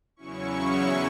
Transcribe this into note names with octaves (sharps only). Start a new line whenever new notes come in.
E2 C#3 F#3 C#4 E4 C#6